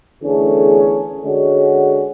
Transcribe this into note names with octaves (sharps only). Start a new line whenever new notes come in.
E2 D3 A3 C#4 G#4
D3 G#3 C#4 F#4